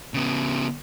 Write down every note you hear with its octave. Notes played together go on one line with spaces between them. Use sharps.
C#3 B3